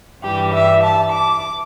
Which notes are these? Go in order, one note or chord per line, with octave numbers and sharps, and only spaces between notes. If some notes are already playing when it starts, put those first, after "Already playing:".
G2 E3 G3 G4
E5
A5
D6